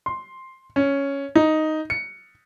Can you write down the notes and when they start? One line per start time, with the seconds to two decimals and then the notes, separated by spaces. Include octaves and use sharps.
0.06 C6
0.76 C#4
1.35 D#4
1.90 C#7